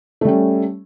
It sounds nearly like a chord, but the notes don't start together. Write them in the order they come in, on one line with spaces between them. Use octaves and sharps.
A3 G3 C#4